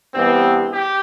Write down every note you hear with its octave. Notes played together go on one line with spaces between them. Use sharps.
G2 E3 G3 B3 C4
G4